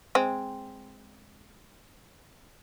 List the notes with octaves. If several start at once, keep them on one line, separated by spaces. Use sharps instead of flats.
G#3 C4